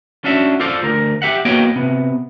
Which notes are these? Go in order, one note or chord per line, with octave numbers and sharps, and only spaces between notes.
C#4 D4 F#4 E5
F4 A4 C5 D5
D2 A#4
G4 E5 F#5
A#3 B3 F#4 C#5 D#5 G5
C3 B3